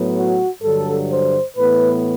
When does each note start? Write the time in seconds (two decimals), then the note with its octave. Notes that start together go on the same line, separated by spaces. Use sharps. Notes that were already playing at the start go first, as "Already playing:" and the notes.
Already playing: A2 F#3 B3
0.15 F#4
0.62 G2 D3 F#3 A4
1.10 C5
1.57 A2 E3 B3 B4